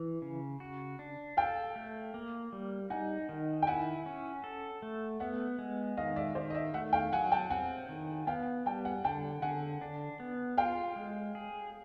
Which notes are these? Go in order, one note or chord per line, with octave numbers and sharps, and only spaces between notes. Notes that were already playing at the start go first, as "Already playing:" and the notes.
Already playing: E3
C#3
F#4
D4
A4 F5 G5
A3
A#3
G3
D#4 F#5 G#5
D#3
G5
E4 F#5 G#5
C#4
A4
A3
B3 E5 F#5
G#3
D#3 D#5 F5
D5 E5
D#3 C5 D5
D#5
D5 E5
A3 E5 F#5
F5 G5
F#3 F#5 G#5
G5 A5
C4 F#5 G#5
D#3
B3 F5 G5
G3 G5 A5
F#5 G#5
D3 G5 A5
D3 F#5 G#5
D4
B3
F4 F5 G5
G#3
G#4